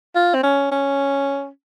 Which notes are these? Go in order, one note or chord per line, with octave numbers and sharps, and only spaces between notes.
F4
C4
C#4
C#4